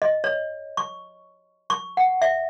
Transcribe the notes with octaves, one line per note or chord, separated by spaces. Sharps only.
D#5
C#5
C#6
C#6
F#5
E5